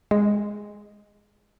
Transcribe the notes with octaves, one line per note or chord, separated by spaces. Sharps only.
G#3